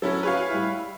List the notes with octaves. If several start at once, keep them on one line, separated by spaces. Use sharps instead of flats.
F#3 C#4 E4 A4
F#4 G#4 B4 C#5 F5
G3 E4